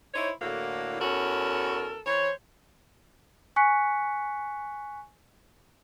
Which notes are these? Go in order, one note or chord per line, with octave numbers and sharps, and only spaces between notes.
D#4 E4 C5 C#5
A2 D3 A#3 E4 F#4
E2 C#4 F#4 A4 A#4
E3 C5 C#5
G#5 C#6 F#6 B6 C#7